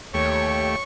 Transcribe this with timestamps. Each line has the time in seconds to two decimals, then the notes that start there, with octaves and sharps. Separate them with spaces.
0.14 D#2 A3 G4 C#5 C#6